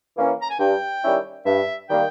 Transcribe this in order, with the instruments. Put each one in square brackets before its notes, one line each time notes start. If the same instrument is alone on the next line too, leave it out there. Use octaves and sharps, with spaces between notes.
[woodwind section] E3 A#3 C#4
[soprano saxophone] A#5
G#5
[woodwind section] G2 [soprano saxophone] G5
[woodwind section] D#3 G3 C#4 E4
[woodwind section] G2 [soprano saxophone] E5
[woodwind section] D#3 G3 A#3 [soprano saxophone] G5